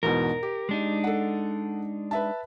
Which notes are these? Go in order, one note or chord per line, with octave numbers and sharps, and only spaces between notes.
E2 G#2 B2 A#4
G4
G#3 D4 D#4
A4 F#5
B4 E5 A5